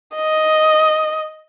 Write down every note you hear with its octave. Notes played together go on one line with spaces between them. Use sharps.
D#5